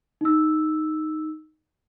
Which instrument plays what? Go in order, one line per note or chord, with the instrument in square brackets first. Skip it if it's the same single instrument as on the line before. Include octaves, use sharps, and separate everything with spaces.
[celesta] D#4 E6